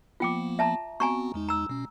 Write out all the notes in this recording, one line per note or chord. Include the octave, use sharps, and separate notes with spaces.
F3 A#3 B3 F4 G5 D6
E5 A5 A#5
B3 C4 F#4 G#5 A#5 C#6
E2 G#3 D#4
A#5 E6
B2 C#4